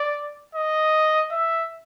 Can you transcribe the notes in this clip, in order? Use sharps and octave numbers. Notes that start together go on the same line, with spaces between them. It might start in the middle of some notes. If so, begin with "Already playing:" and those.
Already playing: D5
D#5
E5